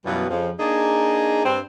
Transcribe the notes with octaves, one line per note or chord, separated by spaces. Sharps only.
F#2 B2 E3 G3 B3 F4
F2 C#3 F3
A#3 D4 D#4 G#4
G2 C4 D4